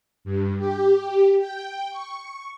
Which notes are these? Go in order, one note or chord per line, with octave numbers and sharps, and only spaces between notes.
G2
G4
G5
C#6